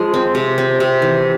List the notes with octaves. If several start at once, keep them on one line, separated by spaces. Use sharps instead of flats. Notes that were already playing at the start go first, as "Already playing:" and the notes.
Already playing: F3 G#3
C4
C3
C4
C3
E3